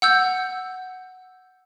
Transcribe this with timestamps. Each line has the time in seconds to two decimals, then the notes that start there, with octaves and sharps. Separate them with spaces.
0.02 F#5 E6 G6